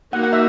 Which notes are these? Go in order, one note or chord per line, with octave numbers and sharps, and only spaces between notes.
A#3 D#4 F#4 F#5
F#5
E5